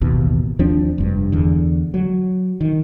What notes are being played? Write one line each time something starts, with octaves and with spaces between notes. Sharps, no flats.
A1 D#2 B2
D#2 F3 C4 D4
F1 G2
E2 D3
F#3
D#3